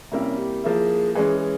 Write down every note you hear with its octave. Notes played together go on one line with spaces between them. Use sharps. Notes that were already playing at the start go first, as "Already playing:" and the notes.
C3 G3 A#3 C#4 E4
G4
F3 A#3 E4 G#4
E3 G#3 C#4 G#4
G#4